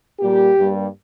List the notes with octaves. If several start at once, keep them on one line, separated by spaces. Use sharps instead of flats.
A#2 G3 A#3 G4
G2 G3 A#3